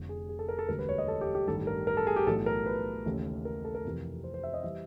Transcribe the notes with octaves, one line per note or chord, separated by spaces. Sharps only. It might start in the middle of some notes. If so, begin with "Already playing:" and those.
Already playing: F1 F2 D3
G#4
G#4
A4
A#4
A4
E1 D2 D3 G3 A#4
B4
C#5
D#5
A4
G4
G4
A1 G2 D#3 G3 A4
A#4
A#4
A4
G#4
G4
B1 A2 E3 A4
A#4
B4
D#2 C#3 E3 A3
A#4
A4
A#4
F2 C3 E3
C5
C5
E5
D#5
E3 G3 E5